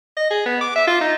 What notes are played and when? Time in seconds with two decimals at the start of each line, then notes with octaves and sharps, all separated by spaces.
0.17 D#5
0.31 G#4
0.46 B3
0.61 D6
0.76 E5
0.87 F4
1.01 D#4